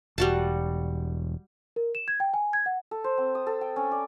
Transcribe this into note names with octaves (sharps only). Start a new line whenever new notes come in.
E1 G3 F#4 A5
A#4
E7
G#6
G5
G#5
G#6
F#5
A4
C5
C4
D#6
A4
G5
C#4
D5